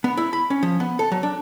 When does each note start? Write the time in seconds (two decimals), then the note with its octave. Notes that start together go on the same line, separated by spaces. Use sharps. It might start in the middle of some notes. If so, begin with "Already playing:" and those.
0.04 B3
0.17 E4
0.33 B5
0.50 C#4
0.63 F3
0.80 B3
0.99 A4
1.12 F#3
1.23 D4